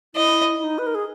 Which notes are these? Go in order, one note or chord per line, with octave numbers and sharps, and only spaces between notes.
E4 D#5
E4
D#4
B4
A#4
G#4